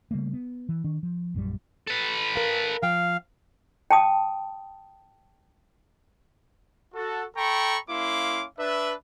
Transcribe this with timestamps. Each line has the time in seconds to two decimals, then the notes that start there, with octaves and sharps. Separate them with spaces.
0.11 C#3 G3 A3 A#3
0.33 B3
0.69 E3
0.84 D#3 D4
1.03 F3
1.34 A#1 F#2 D3 G3
1.87 A4 B4
2.36 A#4 F5
2.83 F3 F5 G5
3.91 G5 A5 D#6
6.94 F#4 A4
7.36 A4 G5 A#5 B5 C#6
7.90 A#3 C#4 E4 F5 C6 D6
8.59 D4 B4 E5